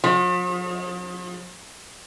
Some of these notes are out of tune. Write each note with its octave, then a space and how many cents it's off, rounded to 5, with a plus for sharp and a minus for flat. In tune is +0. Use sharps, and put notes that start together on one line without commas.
F3 +45